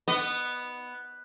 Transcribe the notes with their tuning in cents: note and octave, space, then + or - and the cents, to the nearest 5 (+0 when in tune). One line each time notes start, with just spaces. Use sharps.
B3 +0 D#5 -30